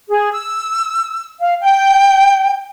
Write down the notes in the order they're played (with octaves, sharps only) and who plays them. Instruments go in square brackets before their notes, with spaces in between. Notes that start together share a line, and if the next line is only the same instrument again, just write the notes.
[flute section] G#4
E6
F5
G5